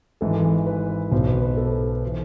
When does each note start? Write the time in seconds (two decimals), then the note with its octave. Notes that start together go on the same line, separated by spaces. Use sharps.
0.21 G#1 G#2 E3 A4
0.67 B4
1.12 B1 B2 C5
1.28 B4
1.42 B4
1.57 A4
2.03 E3 C5